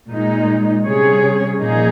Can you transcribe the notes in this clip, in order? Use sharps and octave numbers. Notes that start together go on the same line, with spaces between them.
A#2 G#3 D#4
C3 G3 C#4 G#4 C#5
A#2 F3 A#3 D#4 G#4